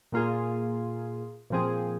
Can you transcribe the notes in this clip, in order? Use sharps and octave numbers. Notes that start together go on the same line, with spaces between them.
A#2 A#3 F4 G#4
A#2 F3 C4 G#4